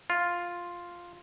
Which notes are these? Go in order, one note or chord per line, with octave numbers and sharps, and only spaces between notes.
F4